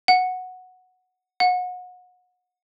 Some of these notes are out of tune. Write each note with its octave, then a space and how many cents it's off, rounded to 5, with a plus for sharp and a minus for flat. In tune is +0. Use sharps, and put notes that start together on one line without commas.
F#5 -5
F#5 -30